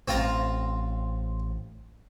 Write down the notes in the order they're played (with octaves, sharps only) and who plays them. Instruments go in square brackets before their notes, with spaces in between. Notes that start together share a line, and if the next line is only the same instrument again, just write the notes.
[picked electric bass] A1 [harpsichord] C4 F4 A#5